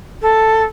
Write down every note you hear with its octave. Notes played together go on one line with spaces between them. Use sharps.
A4